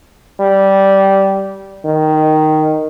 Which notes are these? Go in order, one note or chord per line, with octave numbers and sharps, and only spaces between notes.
G3
D#3